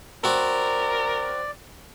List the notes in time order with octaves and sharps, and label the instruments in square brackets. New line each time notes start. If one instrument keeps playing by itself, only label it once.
[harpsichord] C4 F#4 [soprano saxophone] A#4 [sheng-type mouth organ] D5